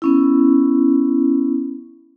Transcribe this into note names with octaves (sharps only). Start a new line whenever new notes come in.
B3 C#4 E4